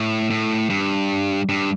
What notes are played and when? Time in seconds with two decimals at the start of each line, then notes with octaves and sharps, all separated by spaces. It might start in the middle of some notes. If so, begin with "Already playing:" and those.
Already playing: A2
0.30 A2
0.70 G2
1.49 G2